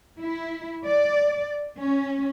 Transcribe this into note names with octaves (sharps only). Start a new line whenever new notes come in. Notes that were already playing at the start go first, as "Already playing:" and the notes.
E4
D5
C#4